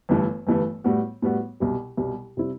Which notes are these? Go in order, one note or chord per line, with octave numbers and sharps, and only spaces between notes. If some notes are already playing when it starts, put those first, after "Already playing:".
G1 G2 E3 A3
G1 G2 E3 A3
A2 G3 B3 F#4
A2 G3 B3 F#4
C2 B2 G3
C2 B2 G3
C3 G3 C4 E4